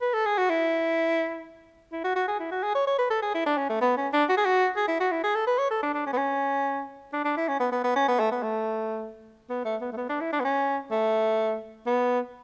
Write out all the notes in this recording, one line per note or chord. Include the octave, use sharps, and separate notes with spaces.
B4
A4
G#4
F#4
E4
E4
F#4
F#4
G#4
E4
F#4
G#4
C#5
C#5
B4
A4
G#4
E4
D4
C#4
A3
B3
C#4
D4
F#4
G#4
F#4
G#4
E4
F#4
E4
G#4
A4
B4
C#5
A4
D4
D4
C#4
B3
C#4
D4
D4
E4
C#4
B3
B3
B3
C#4
B3
A3
B3
A3
B3
A3
B3
A3
B3
D4
E4
D4
B3
C#4
A3
B3